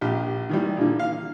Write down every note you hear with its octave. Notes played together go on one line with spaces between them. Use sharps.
A#1 G4
D#3 E3 G3
A#2 D3
F5